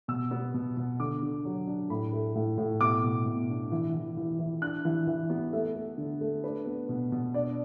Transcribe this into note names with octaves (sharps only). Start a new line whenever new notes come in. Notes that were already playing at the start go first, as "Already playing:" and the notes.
B2 E6
B3
B2
B2
D3 D6
D3
F#3
D4
A2 B5
A3
A2
A2
B2 D6
B2
B2
D4
E3
E3
E3
E3
D4 F#6
E3
E3
B3
A3 E5
A3
D3
A3
D4 B4
B3
B2
B2
D4 D5